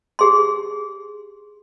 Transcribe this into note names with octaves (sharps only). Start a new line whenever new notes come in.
G4 G#4 C6